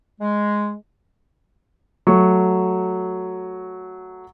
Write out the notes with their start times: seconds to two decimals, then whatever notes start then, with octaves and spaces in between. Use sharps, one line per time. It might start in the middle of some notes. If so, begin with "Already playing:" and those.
0.21 G#3
2.07 F#3 A3 C#6